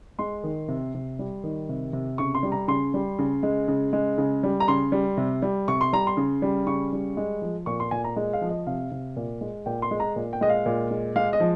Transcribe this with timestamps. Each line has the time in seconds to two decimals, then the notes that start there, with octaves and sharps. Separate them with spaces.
0.19 G#3 C6
0.44 D#3
0.68 C3
0.94 C3
1.19 G3
1.44 D#3
1.69 C3
1.93 C3
2.18 C#3 C#6
2.35 C6
2.43 G3
2.52 A#5
2.68 C#3 C6
2.94 G3
3.19 C#3
3.43 G#3
3.68 C#3
3.93 G#3
4.18 C#3
4.43 G3
4.60 A#5
4.68 C#3 C6
4.92 G3
5.17 C3
5.42 G3
5.68 C3 C#6
5.81 C6
5.93 G3 A#5
6.07 C6
6.17 C#3
6.42 G3
6.67 C#3 C#6
6.93 G3
7.17 G#3
7.42 F3
7.66 A#2 C#6
7.80 C6
7.91 A#2 G#5
8.04 A#5
8.16 G#3
8.33 F5
8.41 F3
8.49 D#5
8.67 C3 F5
8.91 C3
9.16 A#2
9.41 G#3
9.66 A#2 G5
9.82 C6
9.91 G#3
10.00 A#5
10.16 A#2
10.33 G5
10.41 G#3 D#5
10.49 F5
10.66 A#2
10.91 G#3
11.16 G#3 F5
11.33 D#5
11.40 F3